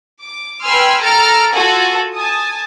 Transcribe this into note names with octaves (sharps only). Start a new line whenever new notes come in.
D6
B4 G5 G#5 C6 E6 F6
A4 A#5 F6 A6 D7
F4 F#4 A4 F#5 G#5
G#5 A5 D#6